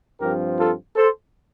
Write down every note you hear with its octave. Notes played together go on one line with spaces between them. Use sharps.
G2 F3 C4 G4 A#4
F4 A4
A4 C5